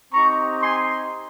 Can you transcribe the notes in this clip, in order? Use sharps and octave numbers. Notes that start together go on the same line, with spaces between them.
C4 D#4 G4 A#5 C#6
G#5 C6